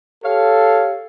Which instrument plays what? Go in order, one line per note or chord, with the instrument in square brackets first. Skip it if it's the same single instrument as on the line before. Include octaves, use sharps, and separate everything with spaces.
[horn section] G4 C#5 F5 [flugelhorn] A4